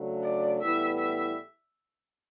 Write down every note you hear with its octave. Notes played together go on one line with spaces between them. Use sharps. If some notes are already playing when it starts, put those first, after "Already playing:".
Already playing: C#3 F#3 A3 D4
D5
A2 E3 G3 B3 E4 E5
E5